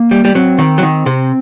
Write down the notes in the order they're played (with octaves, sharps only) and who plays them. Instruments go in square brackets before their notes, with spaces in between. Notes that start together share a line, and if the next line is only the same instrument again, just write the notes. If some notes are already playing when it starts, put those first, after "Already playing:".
Already playing: [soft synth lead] A#3
[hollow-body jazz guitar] G3
G3
[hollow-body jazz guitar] F#3 [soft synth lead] C4
[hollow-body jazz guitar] D#3
F#3
D#3
C3